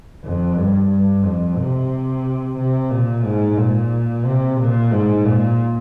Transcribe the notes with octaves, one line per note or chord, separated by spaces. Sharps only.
F2
G2
G2
F2
C3
C3
A#2
G#2
A#2
C3
A#2
G#2
A#2